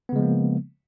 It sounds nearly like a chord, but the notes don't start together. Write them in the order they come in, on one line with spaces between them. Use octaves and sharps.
B3 C#3 G#3 F3 A#3